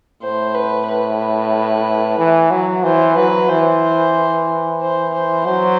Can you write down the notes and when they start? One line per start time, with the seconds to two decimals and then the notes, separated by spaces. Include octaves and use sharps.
0.22 A2 C5
0.54 B4
0.88 B4
2.18 E3
2.51 F#3
2.84 E3 C5
3.17 F#3 B4
3.49 E3 C5
4.81 C5
5.13 C5
5.45 F#3 C5